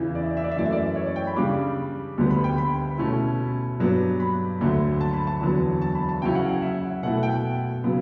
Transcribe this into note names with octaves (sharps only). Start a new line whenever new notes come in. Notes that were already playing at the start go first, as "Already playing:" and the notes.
Already playing: E2 C#3 E3
D5
E5
D5
E5
D5
E5
F#2 E3 A3 D5
E5
D5
C#5
D5
G5
B5
C#3 G3 D4 D6
D2 D3 G3 B3
B5
G5
B5
B2 A3 C#4 E4
G2 F#3 B3 D4
B5
D2 D3 F#3 A3
A5
B5
A5
E2 D3 F#3 B3
A5
B5
A5
C#3 F#3 C#4 E4 G5
F#5
F#5
E5
B2 A3 E4 F#5
G5
C#3 F#3 B3